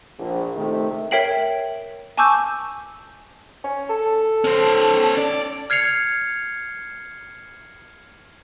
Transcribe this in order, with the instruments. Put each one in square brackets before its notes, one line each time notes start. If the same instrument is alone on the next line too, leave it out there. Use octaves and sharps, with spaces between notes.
[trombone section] A#1
C3 D#3 A3
[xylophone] A#4 C#5 E5 G5 C7 F#7
G#5 A5 C#6 D6 E6 G6
[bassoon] C#4
A4
[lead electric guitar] C#4 C5
D5
[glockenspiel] F6 G#6 C7 C#7 F7